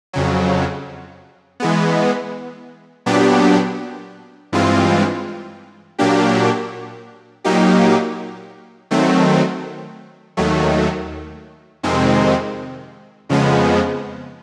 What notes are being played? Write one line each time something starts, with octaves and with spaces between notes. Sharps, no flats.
F2 C#3 F#3
E3 G#3 B3
A#2 F#3 B3 D4 G4
G2 E3 G#3 C4 F4
A#2 F#3 A#3 D4 G4
A#2 F#3 A#3 D#4 G4
D#3 F#3 A3 C4
D#2 D#3 F#3 A3
F2 C3 D#3 G#3 C4
F2 C#3 F3 G#3 B3